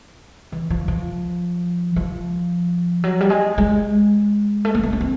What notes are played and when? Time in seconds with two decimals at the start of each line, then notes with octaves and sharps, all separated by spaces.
0.52 E3
0.70 F3
0.88 F3
1.96 F3
3.04 F#3
3.21 G3
3.30 G#3
3.58 G#3
4.65 A3
4.75 A#3
4.83 B3
4.93 C#4
5.01 C4